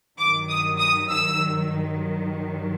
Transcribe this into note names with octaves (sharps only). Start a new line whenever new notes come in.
G2 D#3 F#3 D6
D#6
D#6
E6